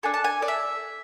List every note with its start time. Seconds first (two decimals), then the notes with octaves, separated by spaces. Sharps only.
0.03 D4 A4 G#5
0.14 A5
0.24 G#5
0.42 D5
0.48 E5